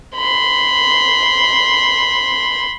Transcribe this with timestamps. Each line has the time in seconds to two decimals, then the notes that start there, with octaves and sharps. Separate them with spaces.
0.15 B5 C6